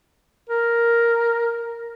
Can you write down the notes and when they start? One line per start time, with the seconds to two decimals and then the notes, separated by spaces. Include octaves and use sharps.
0.49 A#4